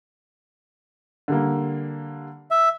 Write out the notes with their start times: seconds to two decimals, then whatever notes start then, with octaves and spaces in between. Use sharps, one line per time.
1.28 D3 G3 A#3
2.51 E5